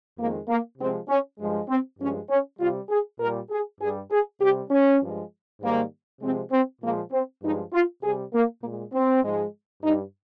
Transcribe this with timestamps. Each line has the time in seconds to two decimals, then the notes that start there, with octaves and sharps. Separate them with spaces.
0.19 F2 D#3 G#3 A#3
0.49 A#3
0.79 C3 F3 G#3 C4
1.09 C#4
1.40 G2 F3 G#3
1.69 C4
2.00 G2 F3 G#3 C#4
2.30 C#4
2.60 C3 G3 F4
2.90 G#4
3.20 A#2 G3 A#4
3.51 G#4
3.81 G2 G3 G#4
4.12 G#4
4.41 C3 G3 G4
4.71 C#4
5.02 G2 F3 G#3
5.62 G#2 D#3 G3 A#3
6.22 C3 F3 G#3 C4
6.52 C4
6.82 A#2 F3 G#3 A#3
7.12 C4
7.43 G2 F3 G#3 D#4
7.73 F4
8.03 C3 G3 G#4
8.34 A#3
8.63 A#2 G#3 A#3
8.94 C4
9.24 G#2 F3 G#3
9.84 G2 G3 D#4